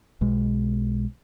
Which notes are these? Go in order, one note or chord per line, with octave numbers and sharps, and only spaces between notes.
B1 B2 G#3